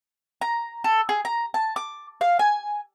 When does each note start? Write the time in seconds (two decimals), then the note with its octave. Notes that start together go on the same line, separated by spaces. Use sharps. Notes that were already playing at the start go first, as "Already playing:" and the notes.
0.41 A#5
0.84 A4
1.09 G#4
1.25 A#5
1.54 A5
1.76 D6
2.21 F5
2.39 G#5